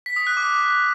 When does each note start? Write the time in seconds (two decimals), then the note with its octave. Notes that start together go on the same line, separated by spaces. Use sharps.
0.06 B6
0.16 D#6
0.27 F#6
0.37 D6